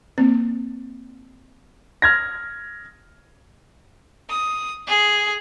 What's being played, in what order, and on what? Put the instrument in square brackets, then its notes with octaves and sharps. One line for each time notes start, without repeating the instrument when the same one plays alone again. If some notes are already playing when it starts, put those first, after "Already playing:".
[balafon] A#3 C4
[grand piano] F6 G#6 A#6
[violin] D#6
G#4